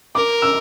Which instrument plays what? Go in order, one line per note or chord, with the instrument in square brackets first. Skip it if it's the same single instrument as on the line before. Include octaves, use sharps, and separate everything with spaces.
[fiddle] A#4 [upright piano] D6
[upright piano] E6